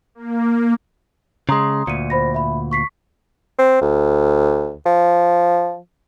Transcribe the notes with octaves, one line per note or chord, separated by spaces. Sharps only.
A#3
C#3 G#3 A#5 C6 D#6
D2 A#2 C#7 D#7
C5 B5 A#6
E5 B5
C#6 B6 C7
C4
D2
F3